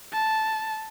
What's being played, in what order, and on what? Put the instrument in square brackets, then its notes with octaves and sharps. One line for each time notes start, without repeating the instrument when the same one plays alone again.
[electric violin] A5